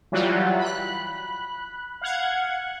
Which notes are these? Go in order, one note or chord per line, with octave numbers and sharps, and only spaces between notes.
E3 F#3 G3 F4 F#4
B5 F#6
F5 F#5 G#6